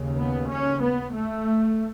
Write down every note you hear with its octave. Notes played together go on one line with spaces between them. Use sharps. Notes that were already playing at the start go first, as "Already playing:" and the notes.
Already playing: D#2 C#3
B3
C#4
B3
A3